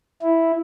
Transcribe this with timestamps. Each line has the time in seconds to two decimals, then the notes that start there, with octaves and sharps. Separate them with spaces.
0.22 E4